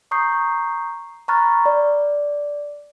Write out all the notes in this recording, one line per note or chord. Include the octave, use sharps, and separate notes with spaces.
A#5 C#6 D#6 G6 C7
A#5 B5 C#6 F6 F#6 A6
D5